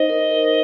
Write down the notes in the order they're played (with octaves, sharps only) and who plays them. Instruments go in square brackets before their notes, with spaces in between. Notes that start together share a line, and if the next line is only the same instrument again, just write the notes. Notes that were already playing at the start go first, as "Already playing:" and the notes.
Already playing: [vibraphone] D#4 C5 [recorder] D#5
[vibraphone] A#4
A#4